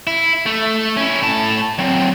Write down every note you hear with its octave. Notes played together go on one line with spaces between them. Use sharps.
E4
A3
C#4 E4
A2 A5
F#3 C4